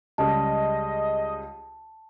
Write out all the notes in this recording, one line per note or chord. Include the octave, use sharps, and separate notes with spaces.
C#2 C#3 G3 D#5 A5